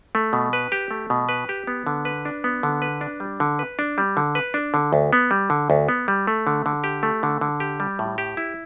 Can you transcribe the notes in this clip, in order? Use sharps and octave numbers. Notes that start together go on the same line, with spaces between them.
A3
B2
B4
G4
A3
B2
B4
G4
B3
D3
B4
D4
B3
D3
B4
D4
G3
D3
B4
D4
G3
D3
B4
D4
D3
D2
B3
G3
D3
D2
B3
G3
A3
D3
D3
G4
A3
D3
D3
G4
G3
A2
G4
E4